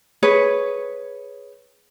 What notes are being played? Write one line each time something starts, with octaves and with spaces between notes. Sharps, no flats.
G#4 B4 C#5